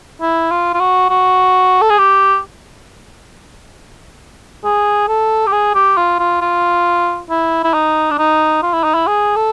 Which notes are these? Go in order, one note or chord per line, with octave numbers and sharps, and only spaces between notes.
E4
F4
F4
F#4
F#4
A4
G#4
G4
G#4
A4
G4
G#4
G4
F4
F4
F4
E4
E4
D#4
D4
D#4
F4
E4
D#4
E4
G#4
A4